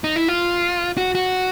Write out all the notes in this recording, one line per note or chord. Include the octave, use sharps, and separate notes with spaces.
D#4
E4
F4
F#4
F#4